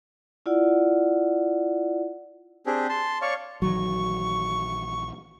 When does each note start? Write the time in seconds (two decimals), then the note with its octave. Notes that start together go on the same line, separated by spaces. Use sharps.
0.46 E4 F4 D5 F#5
2.66 C4 D4 G4 G#4
2.89 A5 C6
3.22 C#5 D5 F5 C#6
3.62 A#1 D#3 E3 F#3 C#6